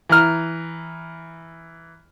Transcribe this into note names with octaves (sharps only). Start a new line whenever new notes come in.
E3 A#5 F6